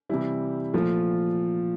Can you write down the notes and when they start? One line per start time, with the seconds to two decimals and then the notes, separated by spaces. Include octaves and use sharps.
0.09 C3 E3 G3 E4
0.74 A#2 F3 A3 F4